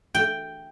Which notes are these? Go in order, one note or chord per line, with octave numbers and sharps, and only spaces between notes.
G5